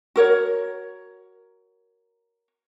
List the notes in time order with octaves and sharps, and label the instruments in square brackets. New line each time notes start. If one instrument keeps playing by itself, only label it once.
[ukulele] F#4 A#4 C#5